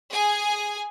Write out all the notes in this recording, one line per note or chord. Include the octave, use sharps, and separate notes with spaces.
G#4 G#5